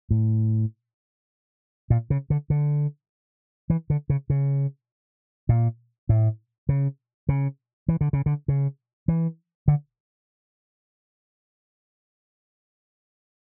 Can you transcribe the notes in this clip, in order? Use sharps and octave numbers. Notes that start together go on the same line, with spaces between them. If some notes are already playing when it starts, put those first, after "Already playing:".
A2
A#2
C#3
D3
D3
E3
D3
C#3
C#3
A#2
A2
C#3
C#3
E3
D3
C#3
D3
C#3
E3
D3